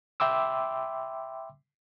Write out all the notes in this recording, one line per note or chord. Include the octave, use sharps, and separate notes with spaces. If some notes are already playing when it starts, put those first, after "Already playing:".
E5 G5 B5 C6 D6 E6